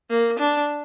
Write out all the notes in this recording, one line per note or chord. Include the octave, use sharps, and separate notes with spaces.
A#3
D4